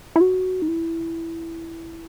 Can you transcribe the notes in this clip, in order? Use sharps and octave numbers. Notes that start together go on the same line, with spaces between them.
E4
F#4
D#4
E4